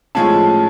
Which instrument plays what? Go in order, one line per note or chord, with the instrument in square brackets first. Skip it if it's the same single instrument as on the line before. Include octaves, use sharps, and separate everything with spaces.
[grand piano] A2 F3 G#3 C#4 F4 [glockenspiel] A5